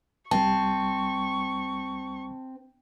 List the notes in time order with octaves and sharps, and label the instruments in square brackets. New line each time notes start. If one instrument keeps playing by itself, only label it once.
[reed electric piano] C2 G3 [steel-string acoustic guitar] C4 [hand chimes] A5 [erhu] C#6